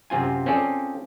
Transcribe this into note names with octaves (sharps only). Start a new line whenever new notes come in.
F#2 C3 C4 F4 G#5
C4 C#4 F4 G#4 A4 D5